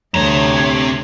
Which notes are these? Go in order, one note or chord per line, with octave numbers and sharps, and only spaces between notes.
D2 C3 C#5 A#5